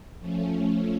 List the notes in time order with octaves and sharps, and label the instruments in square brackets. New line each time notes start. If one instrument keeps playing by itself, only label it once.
[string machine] F3 A3 C#4